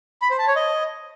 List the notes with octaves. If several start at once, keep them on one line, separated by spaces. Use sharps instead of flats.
B5
C5
A5
C#5
D#5